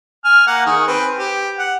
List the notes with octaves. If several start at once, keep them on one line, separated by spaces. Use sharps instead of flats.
G#5 F6
A#3 F#5
D#3 G#4
C4 B4
G4
F#5